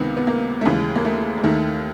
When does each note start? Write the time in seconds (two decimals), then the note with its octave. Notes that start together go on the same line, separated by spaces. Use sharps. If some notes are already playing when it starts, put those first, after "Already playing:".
Already playing: C#2 C3 D#3 B3
0.17 B3
0.27 A#3
0.61 A3
0.65 D#2 C#3 E3 G#3
0.95 A#3
1.05 A3
1.38 G#3
1.43 D#2 D#3 A3